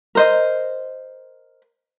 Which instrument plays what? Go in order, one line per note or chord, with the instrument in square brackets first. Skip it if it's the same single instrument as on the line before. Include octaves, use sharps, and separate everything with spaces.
[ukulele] A#4 C5 D#5